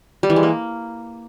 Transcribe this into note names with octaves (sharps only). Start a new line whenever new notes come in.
G3
E3
G#3
A#3